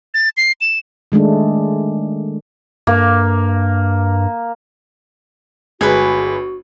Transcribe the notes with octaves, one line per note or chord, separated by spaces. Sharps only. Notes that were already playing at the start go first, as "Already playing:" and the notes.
A6
C7
E7
D#3 G#3 A3 D4
G2 A#3
G1 G#3 F#4 B4 G#5